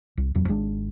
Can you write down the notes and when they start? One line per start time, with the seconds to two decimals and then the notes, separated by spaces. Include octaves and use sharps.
0.17 C2
0.35 D#1 F2 F#3
0.48 G#1 G#3 C4 D4